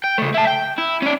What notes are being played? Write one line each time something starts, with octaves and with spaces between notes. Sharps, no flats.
G5
C#3 A3
E4 A5
G5
E4
C#4 D5